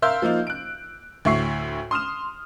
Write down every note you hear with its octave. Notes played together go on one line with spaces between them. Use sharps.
A#4 E5 F5 C6 E6 G6
F3 A#3 D#4 F4
F#6 D7
D2 A2 E5 C#6 C7
C6 D#6 F6 E7